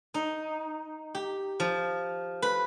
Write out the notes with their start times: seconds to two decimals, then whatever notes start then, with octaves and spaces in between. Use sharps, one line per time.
0.14 D#4
1.15 G4
1.60 F3
2.42 B4